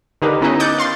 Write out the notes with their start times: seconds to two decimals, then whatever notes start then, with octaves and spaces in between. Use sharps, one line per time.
0.22 D3 D#4 G4 A#4 B4
0.41 B3 C#4 D#4 E4 B4 D#5
0.60 D6 D#6 F#6 G6 A6 C#7
0.78 F5 C6 A6